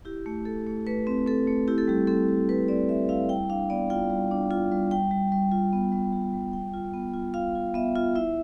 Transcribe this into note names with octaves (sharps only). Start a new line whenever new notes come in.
E4 G4
A3
A3 A4
A3
A3 B4
C4
C4 A4
A3
E4 G4
A4
G3 G4
C4 A4
G3
G3 B4
C4 D5
G3 E5
E4 F5
G3 G5
D4 F5
B3 D5
F4 G5
G3
D4
F4
G3
G3 G5
G3
G3
F4
B3
G3
G3
G3
F4 G5
F4
B3
F4
F4 F5
F4
B3 E5
F4
E4 E5